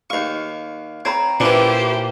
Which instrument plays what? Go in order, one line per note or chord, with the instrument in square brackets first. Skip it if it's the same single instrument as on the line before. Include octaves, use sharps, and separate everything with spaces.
[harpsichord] D#2 C#6 [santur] F5
[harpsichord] C4 [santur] C#5 A#5 B5
[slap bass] A#2 [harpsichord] E3 D4 [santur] C#4 E4 C#6 [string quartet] G4 C5